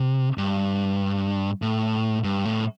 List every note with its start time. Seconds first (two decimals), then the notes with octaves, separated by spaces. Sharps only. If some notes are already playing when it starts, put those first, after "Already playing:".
Already playing: C3
0.38 G2
1.62 A2
2.24 G2
2.45 A2